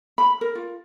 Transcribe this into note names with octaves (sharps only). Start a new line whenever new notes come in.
B5
A#4
F4